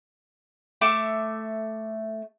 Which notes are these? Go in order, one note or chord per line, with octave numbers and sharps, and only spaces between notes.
A3 E5 D6